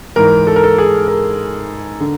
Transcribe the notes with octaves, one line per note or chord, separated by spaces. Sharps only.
G#2 E3 A#4
A4
A#4
A4
G#4
A#4
D3